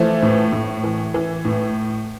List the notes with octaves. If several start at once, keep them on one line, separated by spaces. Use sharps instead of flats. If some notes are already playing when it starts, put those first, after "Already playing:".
Already playing: E3 F3 A3
A2
A2
E3
E3
A2